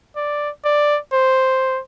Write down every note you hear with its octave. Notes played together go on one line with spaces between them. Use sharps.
D5
D5
C5